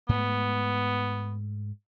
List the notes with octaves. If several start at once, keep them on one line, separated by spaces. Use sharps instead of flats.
G#2 A3 B3